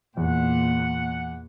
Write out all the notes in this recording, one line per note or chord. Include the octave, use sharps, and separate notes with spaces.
E2 A#2 F#5